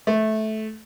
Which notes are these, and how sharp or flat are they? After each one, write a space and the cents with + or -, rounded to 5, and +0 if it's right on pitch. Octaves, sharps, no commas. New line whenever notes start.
A3 -15